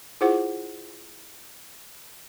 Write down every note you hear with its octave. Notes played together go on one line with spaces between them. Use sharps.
E4 F4 G#4 C5 F#5 D6